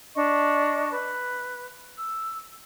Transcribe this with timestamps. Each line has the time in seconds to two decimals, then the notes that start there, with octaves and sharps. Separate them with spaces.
0.15 D4 D#5 C#6
0.91 B4
1.97 E6